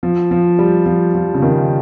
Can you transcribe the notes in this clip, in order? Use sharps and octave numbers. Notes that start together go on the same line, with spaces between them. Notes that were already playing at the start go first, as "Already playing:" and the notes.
F3
F3
G3
F3
F3
C#3
D#3